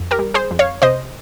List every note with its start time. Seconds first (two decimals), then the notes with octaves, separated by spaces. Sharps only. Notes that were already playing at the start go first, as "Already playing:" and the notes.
Already playing: F2
0.11 G4 A#4
0.19 G3
0.34 G#4 C5
0.51 F2
0.59 C#5 F5
0.82 C3 C5 D#5